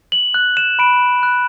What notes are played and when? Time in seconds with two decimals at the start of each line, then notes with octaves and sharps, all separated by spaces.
0.12 F#7
0.34 F#6
0.57 E7
0.79 B5 D7
1.23 F#6